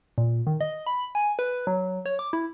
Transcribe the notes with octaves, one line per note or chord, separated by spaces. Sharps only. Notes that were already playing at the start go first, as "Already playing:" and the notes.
A#2
D#3
D#5
B5
G#5
B4
F#3
C#5
D6
E4